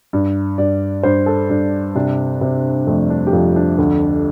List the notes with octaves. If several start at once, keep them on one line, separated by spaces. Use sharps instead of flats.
G2
G2 D5
G2 C5
A4
G2
C3 D4
C3 C4
F2 A3
D4
G4
F2 F4
D4
D2